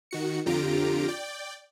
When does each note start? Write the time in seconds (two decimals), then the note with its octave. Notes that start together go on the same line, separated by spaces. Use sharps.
0.11 D#3 F#4 C#7
0.46 F2 D3 F4 G4 A#5 D7
1.08 D5 G5